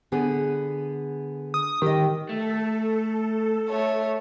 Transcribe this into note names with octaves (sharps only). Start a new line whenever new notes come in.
D3 B3 G#4
D#6
D#3 G4 D#5
A3 A4
A3 C#5